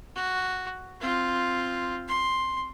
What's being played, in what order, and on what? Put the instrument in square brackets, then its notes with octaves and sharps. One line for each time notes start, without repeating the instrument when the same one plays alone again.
[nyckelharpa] F#4
C4 F4
C6